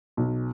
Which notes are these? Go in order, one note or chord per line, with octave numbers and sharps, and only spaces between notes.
B1